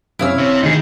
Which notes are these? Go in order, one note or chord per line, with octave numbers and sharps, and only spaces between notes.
F#2 C3 C#4 E4 F5 E6
C3 C#5
D2 D#3 D#4 G#4